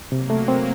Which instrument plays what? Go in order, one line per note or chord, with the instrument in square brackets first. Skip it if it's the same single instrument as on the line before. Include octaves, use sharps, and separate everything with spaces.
[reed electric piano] C3 [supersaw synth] F#3 A#3
[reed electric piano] A3
C4